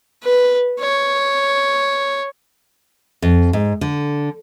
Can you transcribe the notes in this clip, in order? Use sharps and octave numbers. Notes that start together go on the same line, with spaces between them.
B4
C#5
F2
G#2
D3